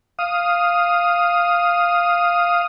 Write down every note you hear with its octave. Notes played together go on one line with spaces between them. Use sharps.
F5 D#6